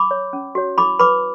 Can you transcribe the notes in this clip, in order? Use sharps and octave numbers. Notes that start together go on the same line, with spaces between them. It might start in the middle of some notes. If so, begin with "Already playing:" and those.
Already playing: B5 D6
C#5
C#4
F#4 C#5
E4 B5 D6
B4 B5 D6